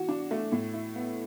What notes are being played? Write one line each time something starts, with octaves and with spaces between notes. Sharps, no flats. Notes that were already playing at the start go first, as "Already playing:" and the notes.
Already playing: E3 F#4
D4
A3
A2
E4
B3